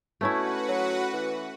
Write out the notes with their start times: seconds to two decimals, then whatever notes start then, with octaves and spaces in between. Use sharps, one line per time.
0.21 B2 A3 C#4 E4 F#4 B4 F#5
0.69 F#3
1.13 E3